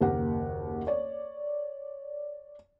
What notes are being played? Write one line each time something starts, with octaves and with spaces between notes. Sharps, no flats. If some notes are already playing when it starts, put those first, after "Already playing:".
F#1 D#2 G4 A#4 F#5
C#5 D5